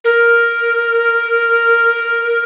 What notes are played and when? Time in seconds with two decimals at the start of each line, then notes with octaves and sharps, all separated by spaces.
0.05 A#4